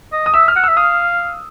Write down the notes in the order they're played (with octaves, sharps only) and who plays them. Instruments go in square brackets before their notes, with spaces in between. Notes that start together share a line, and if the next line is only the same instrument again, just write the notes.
[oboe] D#5
[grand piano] D#6
[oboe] E5 [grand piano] E6
[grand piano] F6
[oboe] F#5
[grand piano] E6
[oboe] E5
[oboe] F5 [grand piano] D#6